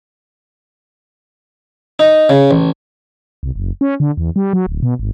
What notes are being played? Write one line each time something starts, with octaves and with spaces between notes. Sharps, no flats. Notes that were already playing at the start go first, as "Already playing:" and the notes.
D#4
C#3
A1
C2
F#1
C#4
D3
E2
G3
F#3
D1
B2
G#1